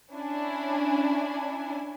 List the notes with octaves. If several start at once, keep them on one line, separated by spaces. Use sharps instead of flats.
C#4 D4 E4 G#5